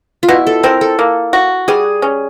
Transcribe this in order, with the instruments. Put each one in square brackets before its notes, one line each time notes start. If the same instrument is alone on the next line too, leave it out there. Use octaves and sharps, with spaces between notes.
[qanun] F4
[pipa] B2 [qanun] E4
[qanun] A4
[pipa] C4 [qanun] A#4
[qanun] A4
[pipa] A#3
F#4
[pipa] G3 [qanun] G#4
[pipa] C#4